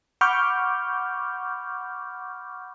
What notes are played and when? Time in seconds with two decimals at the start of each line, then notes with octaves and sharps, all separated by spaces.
0.21 F#5 B5 C#6 D6 F6 G6